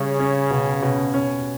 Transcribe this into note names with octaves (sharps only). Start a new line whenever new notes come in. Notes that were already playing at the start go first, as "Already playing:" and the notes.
Already playing: C#3 G3 C#4
C#4
B2
B2
C#4